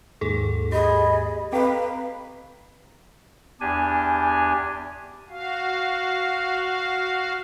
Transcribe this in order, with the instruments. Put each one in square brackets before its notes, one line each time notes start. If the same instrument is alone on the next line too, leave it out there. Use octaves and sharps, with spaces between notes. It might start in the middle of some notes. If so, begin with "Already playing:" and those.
[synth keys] D#2 G#2 [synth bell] G#4 A4
[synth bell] G4 [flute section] G#4 B5 [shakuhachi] D#5
[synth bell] C4 A4 [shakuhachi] B4 [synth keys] D#5 F5 G5 [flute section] A#5
[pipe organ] E2 D4 G4 G#5
F#4 F5